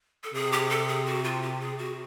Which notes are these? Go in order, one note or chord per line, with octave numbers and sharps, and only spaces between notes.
A4
C3 G#4
G4
A4
G#4
F#4
F4
G4
G#4
F#4